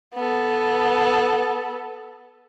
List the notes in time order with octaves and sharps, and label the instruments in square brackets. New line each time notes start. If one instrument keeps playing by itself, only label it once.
[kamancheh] B3 A4